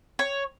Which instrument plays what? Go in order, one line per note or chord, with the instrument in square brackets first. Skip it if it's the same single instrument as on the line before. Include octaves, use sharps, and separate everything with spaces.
[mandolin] C#5